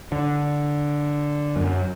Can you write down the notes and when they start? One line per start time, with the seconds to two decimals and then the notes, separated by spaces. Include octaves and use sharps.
0.12 D3
1.56 F#2